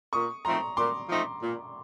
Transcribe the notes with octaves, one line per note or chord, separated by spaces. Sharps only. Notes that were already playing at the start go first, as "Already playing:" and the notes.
A#2 C#6 D#6
F3 A3 C4 D#4 A#5 C6
A#2 C6 D6
F3 A3 C4 D#4
A#2